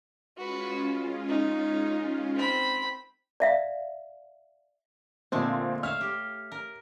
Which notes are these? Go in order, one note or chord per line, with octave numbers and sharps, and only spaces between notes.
G#3 C#4 F4 F#4 B4
D#4
C4 B5
D5 E5 F5
A#2 D3 G#3 A3 C4
C#5 E5 F5 F6
G4
A#4